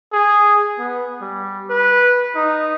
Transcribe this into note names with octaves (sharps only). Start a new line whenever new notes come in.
G#4
B3
G3
B4
D#4